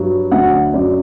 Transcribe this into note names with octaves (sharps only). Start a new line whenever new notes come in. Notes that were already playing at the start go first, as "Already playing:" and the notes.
Already playing: G2 F#3
D2 D3 F#3 F#5
F#2 F#3 D5